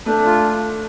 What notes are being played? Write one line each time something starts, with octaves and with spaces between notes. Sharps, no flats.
A3 D4
F4